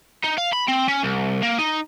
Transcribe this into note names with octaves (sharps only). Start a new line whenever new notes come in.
D#4
F5
B5
C4
C#4
C2
A#3
D#4